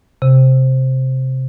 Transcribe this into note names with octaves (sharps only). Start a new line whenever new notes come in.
C3